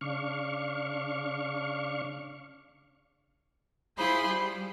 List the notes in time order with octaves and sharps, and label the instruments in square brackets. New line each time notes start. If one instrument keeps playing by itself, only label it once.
[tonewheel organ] C#3 D4 F5 C#6
[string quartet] E4 F4 G#4 C5 B5 C6
G3